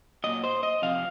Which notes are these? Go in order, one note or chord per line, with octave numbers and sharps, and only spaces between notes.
A#2 F#3 D#5
C5
D#5
C3 F3 F5